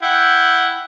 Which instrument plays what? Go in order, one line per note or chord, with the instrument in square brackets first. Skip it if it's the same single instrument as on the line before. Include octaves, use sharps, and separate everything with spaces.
[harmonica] E4 F#5 G5